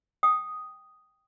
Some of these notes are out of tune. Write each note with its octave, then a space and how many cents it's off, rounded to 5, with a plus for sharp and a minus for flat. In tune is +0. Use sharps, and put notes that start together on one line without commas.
G5 +0 D#6 +0